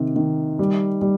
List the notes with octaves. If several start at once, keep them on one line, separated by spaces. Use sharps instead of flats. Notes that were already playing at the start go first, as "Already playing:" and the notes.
Already playing: C3 D#3
D#3
G3
G3